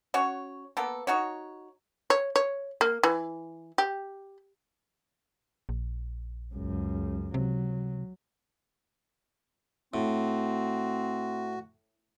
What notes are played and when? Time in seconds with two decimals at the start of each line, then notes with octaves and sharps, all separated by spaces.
0.14 C#4 F#4 C#5
0.77 A#3 B3 A4
1.07 D#4 F#4 C#5
2.10 C#5
2.36 C#5
2.81 A#3
3.03 E3
3.78 G4
5.69 A#1
6.54 C#2 F#2
7.34 C3 F#3
9.94 A2 C4 F#4